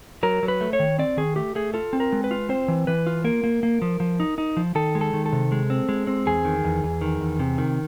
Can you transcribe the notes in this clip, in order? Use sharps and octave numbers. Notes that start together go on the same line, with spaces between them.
F#3 A#4
F#3
B4
A3
C#5
D#3
C4 D5
D#3 G#4
A3 G4
A3 G#4
F4 A4
C4
A#4
G#3
B4
F4
C4 C5
E3
E3 B4
F4
A#3 A#4
A#3
A#3
F3
F3
D#4
D#4
F3
D#3 A4
G#3
A4
D#3
A4
C3
G#3
C4
G#3
C4
E2 G#4
D#3
E2
E2
D#3
E2
C3
D#3